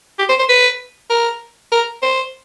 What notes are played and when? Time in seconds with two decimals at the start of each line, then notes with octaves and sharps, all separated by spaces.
0.19 G4
0.29 C5
0.39 C5
0.49 B4
1.10 A#4
1.72 A#4
2.02 C5